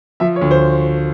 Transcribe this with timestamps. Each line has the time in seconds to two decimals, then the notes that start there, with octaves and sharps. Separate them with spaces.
0.20 F3 E5
0.36 C#5
0.41 D2
0.51 C5